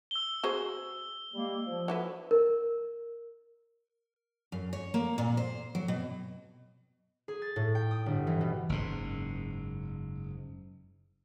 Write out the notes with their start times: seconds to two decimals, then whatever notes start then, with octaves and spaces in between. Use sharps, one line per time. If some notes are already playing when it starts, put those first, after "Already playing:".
0.11 E6 G7
0.43 F#4 G#4 C5
1.33 G3 G#3 A#3
1.65 F3
1.88 F#3 E4 B4
2.31 A#4
4.52 F#2
4.73 C#5
4.94 A#3
5.18 A#2
5.37 C5
5.75 F#3
5.88 B2
7.28 G#4
7.42 A6
7.56 A2
7.75 G5
7.91 D#6
8.06 G1
8.27 E3
8.41 B2
8.69 F#1 G#2